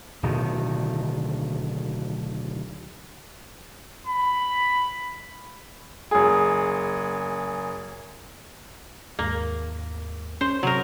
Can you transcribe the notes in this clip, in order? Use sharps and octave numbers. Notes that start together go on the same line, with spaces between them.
D1 B2 D3 D#3
B5
F#1 G#4
D#2 G#2 A#3
C#4 C5
C3 F#3 A#4